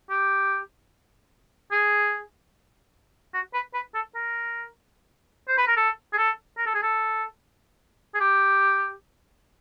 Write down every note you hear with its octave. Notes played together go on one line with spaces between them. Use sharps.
G4
G#4
F#4
B4
B4
A4
A#4
C5
B4
A#4
A4
G#4
A4
A#4
A4
G#4
A4
G#4
G4